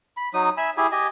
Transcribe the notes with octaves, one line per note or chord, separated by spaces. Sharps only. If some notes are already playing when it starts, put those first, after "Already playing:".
B5
F#3 D#4 D#6
E5 G#5 B5 E6
E4 G4 G#4 G#5
G4 D#5 G#5